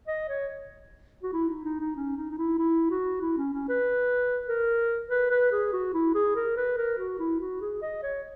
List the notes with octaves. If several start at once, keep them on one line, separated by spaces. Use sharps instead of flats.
D#5
C#5
F#4
E4
D#4
D#4
D#4
C#4
D#4
D#4
E4
E4
F#4
E4
C#4
C#4
B4
A#4
B4
B4
G#4
F#4
E4
G#4
A#4
B4
A#4
F#4
E4
F#4
G#4
D#5
C#5